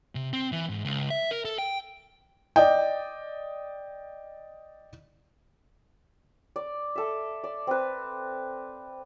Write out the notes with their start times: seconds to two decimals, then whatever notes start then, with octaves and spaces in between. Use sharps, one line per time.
0.15 C3
0.33 C4
0.52 E3
0.69 G#2
0.85 C#2
1.10 E5
1.31 A#4
1.45 A4
1.58 G5
2.56 D5 D#5 G5
6.56 D5
6.96 A4 E5
7.44 D5
7.67 C4 B4